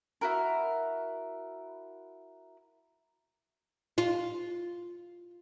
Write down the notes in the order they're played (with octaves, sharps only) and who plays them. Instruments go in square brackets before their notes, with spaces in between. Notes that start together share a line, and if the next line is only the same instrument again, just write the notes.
[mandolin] E4 F#4 A#4
[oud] F4